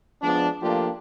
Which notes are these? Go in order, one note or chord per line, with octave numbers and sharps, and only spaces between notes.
F3 G#3 B3 D4
F3 A3 A#3 D4 F4 G4